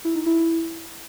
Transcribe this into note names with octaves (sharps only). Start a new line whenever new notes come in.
E4
D#4
E4